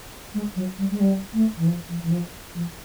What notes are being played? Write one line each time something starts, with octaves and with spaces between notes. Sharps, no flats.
G#3
F#3
G3
G#3
G3
A3
E3
F3
F3
E3
F3
F3